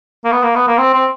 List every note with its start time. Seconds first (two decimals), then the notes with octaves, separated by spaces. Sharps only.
0.25 A#3
0.32 B3
0.43 A#3
0.55 B3
0.67 A#3
0.78 C4
0.94 C4